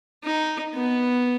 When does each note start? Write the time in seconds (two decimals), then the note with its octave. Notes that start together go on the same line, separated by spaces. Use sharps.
0.24 D#4
0.74 B3